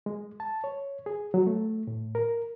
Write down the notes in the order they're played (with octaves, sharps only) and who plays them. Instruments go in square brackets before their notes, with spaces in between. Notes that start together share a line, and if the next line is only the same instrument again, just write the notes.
[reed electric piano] G#3
A5
C#5
G#4
F#3
A3
A2
A#4